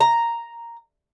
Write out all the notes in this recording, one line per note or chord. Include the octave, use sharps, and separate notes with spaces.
A#5